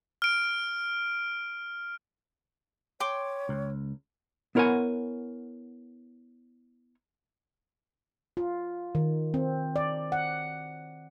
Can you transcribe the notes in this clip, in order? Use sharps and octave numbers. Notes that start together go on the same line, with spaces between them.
F6 D7
C#5 G5 C6 D6
C#2
B3 E4 A#4 C#5 F#5 G#5
F4
D#3
C4
D5
F#5